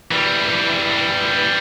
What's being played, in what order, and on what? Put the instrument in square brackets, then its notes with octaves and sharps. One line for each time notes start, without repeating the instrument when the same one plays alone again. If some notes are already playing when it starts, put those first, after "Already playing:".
[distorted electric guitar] E3 G3